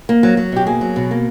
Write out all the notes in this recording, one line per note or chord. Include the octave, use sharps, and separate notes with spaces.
A#3
F#3
F#3
B2 G4
A#3 G#4
F#3
B2
A#3